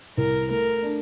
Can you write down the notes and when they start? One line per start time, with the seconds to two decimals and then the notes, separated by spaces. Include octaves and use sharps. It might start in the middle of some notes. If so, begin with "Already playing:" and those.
0.17 C2 A#4
0.50 A3 A#4
0.83 D4